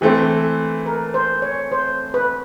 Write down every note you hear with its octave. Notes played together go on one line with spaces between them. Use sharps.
E3 A3 C4 G4
A#4
C5
C#5
C5
B4